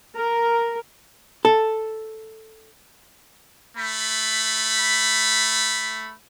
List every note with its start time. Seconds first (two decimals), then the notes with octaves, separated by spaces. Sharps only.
0.16 A#4
1.45 A4
3.77 A3 B5